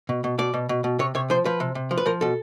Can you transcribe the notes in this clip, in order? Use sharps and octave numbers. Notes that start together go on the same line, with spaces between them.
B2
B2
B2 D5
B2
B2
B2
C3 C#5
C3 C#5
F3 C5
F3 B4
C3
C3
F3
B4
F3 A#4
B2 A4